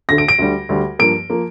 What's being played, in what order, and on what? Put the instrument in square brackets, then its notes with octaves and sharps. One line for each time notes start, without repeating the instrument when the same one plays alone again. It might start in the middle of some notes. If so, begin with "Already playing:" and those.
[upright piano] D2 D3 A3 A#6
D7
D7
D2 D3 G3
D2 D3 G3
G2 F3 A#3 D7
F3 A#3